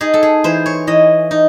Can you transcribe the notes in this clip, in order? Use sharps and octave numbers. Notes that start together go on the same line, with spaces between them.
D#4 G#4
A4
G#4
E3 C5
C#5
E3 D#5
D#4